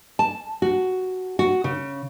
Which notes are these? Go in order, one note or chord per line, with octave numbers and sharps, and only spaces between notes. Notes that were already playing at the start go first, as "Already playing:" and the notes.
A5
F#4
F#4
C#3